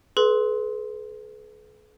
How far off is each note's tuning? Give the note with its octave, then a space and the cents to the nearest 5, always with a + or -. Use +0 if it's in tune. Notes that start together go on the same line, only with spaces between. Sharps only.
G#4 +45 B4 -5 C6 +0